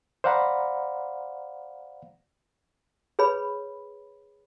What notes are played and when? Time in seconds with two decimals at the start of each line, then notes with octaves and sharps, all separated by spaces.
0.24 C5 D5 F5 F#5 A#5 B5
3.19 G#4 B4 C#5 B5